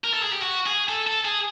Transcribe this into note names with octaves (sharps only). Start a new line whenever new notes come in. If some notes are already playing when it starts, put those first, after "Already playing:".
A#4
A4
G#4
G4
F#4
G#4
A4
A4
G#4